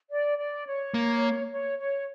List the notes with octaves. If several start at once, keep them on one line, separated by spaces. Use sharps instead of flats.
D5
D5
C#5
A#3
C#5
C#5